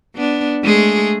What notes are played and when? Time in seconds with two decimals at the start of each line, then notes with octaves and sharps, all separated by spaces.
0.15 B3 D4
0.63 G#3 A3 G#4